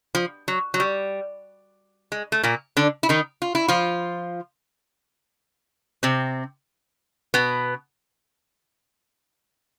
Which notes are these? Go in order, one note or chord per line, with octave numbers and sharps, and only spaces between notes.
F3
F#3
F#3
G3
G#3
A3
A#2 A#3
D3 D4
E4
D#3 D#4
F4
E4
F3 F4
C3 C4
B2 B3